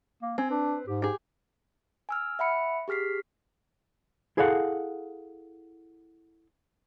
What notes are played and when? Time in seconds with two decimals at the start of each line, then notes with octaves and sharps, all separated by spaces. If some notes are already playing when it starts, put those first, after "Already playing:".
0.22 A#3
0.38 C4 G#5
0.50 D4 B4
0.87 G#2 G4
1.02 G4 G#4 D6
2.09 G#5 E6 F6
2.39 E5 F#5 B5 C#7
2.88 G4 G#4 F6 B6 C7
4.37 E4 G#4 A4 C#5 F5 F#5